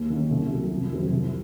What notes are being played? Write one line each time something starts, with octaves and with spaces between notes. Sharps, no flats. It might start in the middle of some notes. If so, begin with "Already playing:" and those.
Already playing: D#2
D#3 A#3 C#4
C2
C3 F#3
F2
C3 D#3 F#3 C4
C2